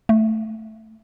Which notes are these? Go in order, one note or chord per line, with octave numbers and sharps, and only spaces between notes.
A3